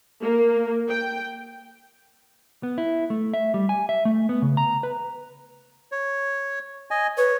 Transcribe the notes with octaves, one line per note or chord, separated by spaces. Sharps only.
A#3
G5
B3
E4
A3
E5
G3
G#5
E5
A3
B3
C#3
A#5
B4
C#5
D#5 G#5
B4 C#5